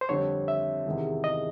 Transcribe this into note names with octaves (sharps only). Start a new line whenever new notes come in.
C5
F2 D3 G3 C4 C#5
E5
E2 C3 D#3 G#3
D#5